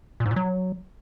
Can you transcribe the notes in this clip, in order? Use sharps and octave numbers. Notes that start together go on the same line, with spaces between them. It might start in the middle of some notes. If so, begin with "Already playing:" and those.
A#2
G#2
A#2
F#3